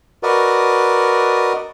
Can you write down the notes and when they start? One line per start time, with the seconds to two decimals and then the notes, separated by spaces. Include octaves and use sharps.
0.23 F#4 A#4 B4 D5 D#5